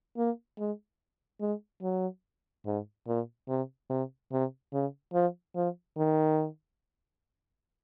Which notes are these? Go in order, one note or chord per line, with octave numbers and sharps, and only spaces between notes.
A#3
G#3
G#3
F#3
G#2
A#2
C3
C3
C3
C#3
F3
F3
D#3